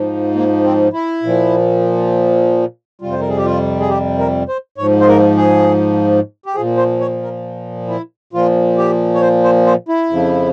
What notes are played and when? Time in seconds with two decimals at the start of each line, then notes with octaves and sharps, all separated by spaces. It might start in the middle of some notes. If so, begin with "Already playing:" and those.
Already playing: G#2 F3
0.35 A#3
0.64 C4
0.93 E4
1.23 A#2 F3
3.01 F2 C3 G3 F4
3.12 C5
3.20 A#4
3.29 G#4
3.37 G4
3.45 F4
3.80 G#4
3.89 G4
4.19 A#4
4.48 C5
4.78 G#2 F3 C#5
5.01 C5
5.08 A#4
5.37 G#4
6.46 G4
6.55 A#2 F3 G#4
6.77 C5
7.00 C#5
7.22 A#4
7.88 E4
8.33 A#2 F3 F4
8.78 G4
9.15 C#5
9.22 C5
9.44 C5
9.66 C5
9.89 E4
10.10 F2 C#3 F3